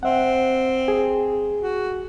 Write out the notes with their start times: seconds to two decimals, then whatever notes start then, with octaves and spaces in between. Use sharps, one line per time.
0.03 C4 E5 F#5
0.88 G#4
1.60 F#4